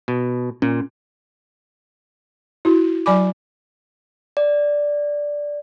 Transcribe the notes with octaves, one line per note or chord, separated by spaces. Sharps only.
B2
A#2 C#4
E4 F#4
F#3 D5 G#5 B5 D6
D5